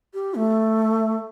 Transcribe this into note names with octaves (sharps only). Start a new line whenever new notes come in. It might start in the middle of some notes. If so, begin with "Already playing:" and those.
G4
A3